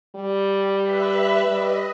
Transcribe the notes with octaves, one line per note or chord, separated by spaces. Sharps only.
G3
B4 E5 B5
G3 D#5